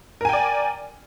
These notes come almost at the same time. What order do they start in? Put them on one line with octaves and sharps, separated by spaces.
A#4 G#5 G5 D5